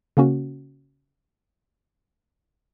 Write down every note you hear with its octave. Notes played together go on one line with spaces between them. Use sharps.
C#3 A#3 C#4 F#4